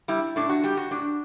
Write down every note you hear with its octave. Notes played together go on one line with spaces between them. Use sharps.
G3 E4
A2 D4
F#4
G3 G4
F#4
A2 D4